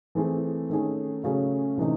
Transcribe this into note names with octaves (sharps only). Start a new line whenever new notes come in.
E3 A3 C4 E4 G#4
D#3 A3 C#4 G#4
C#3 F#3 A3 C#4 G#4
C3 E3 A3 D#4